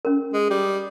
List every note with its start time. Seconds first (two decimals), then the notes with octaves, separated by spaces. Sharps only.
0.05 C#4 A#4
0.33 G#3
0.51 G3